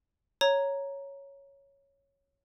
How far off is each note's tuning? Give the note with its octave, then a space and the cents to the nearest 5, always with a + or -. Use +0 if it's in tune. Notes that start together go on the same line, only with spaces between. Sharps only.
C#5 +0 A#5 +0